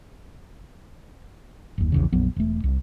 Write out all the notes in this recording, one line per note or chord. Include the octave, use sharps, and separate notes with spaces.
F#1 D#2
A#1 E2 C#3
A#1 F2 F#3 B3
E1 A3
C2